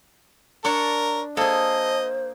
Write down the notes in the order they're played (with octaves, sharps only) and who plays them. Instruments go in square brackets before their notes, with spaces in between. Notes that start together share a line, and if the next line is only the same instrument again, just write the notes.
[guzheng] D4 A5 [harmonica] A#4 [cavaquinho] C#5 C#6
[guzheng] A#3 G#4 [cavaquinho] A4 [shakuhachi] C5 [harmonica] D#5